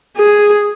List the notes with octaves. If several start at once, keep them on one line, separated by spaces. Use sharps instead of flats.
G#4